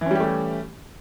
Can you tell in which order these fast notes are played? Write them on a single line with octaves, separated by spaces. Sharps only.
E3 C#4 G3 G4 A3